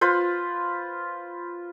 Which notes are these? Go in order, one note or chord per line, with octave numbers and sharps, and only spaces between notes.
F4 B4 C5